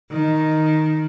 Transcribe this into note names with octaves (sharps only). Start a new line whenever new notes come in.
D#3